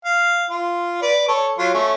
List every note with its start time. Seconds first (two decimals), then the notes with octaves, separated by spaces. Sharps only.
0.05 F5
0.50 F4
1.02 B4 D5
1.28 A4 C#5
1.59 F#3 F4
1.74 A3 C#4 C#6